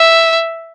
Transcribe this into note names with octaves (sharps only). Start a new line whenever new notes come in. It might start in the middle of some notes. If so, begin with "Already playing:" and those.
Already playing: E5